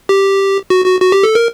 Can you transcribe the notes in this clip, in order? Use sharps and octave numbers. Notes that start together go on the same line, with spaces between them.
G4
F#4
F#4
F#4
G4
A4
A#4